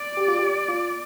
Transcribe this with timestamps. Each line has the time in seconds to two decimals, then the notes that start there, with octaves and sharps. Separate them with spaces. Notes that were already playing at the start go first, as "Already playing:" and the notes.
Already playing: D5
0.17 G4
0.28 F4
0.39 G4
0.68 F4